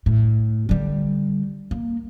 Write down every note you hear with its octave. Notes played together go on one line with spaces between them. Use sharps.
A2
D3 G3
A#3